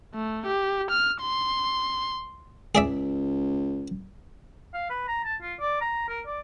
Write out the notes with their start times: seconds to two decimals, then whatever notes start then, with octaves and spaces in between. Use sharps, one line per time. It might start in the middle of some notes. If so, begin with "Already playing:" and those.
0.14 A3
0.46 G4
0.91 F6
1.22 C6
2.75 C#2 G#4 D5 E5
4.74 F5
4.90 B4
5.08 A#5
5.24 A5
5.42 F4
5.60 D5
5.81 A#5
6.09 A#4
6.27 D5